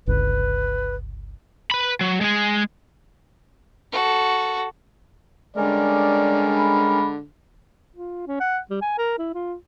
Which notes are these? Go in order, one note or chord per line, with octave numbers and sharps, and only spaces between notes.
G1 C#2 B4
B4 B5
F#3
G#3 G#4
F#4 A4
D3 G3 G#3 C#4 A#4 D5
B5
F4
C#4
F#5
G3
G#5
A#4
E4
F4